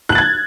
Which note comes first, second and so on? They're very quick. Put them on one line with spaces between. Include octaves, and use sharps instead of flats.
F#6 F#7 A6 G#6